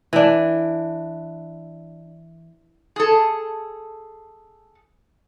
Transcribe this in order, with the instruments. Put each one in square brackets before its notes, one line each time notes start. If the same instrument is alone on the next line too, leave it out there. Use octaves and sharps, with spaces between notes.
[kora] E3 D4
[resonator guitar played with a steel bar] G#4 A4